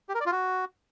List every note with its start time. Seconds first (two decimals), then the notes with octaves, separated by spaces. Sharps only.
0.09 G4
0.15 A#4
0.20 D5
0.26 F4
0.32 F#4